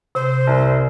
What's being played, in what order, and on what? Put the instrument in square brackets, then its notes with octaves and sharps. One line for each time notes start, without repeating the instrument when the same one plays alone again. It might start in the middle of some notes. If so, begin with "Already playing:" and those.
[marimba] C3 [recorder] C5
[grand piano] C2